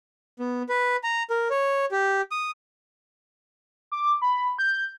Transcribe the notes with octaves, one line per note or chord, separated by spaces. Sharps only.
B3
B4
A#5
A#4
C#5
G4
D#6
D6
B5
G6